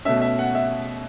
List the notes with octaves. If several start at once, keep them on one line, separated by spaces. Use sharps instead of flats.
B2 A3 C#4 E5
E5
F#5
E5